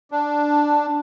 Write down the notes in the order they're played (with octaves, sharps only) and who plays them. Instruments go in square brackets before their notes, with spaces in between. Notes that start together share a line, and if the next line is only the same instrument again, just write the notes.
[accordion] D4